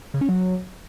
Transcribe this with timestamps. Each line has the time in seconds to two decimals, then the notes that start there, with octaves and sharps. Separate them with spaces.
0.14 C#3
0.21 C#4
0.29 F#3